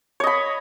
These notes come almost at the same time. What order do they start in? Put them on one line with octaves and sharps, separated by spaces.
C#5 D#5 B5